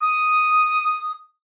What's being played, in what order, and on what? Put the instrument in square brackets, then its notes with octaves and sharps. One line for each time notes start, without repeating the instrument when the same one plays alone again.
[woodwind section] D#6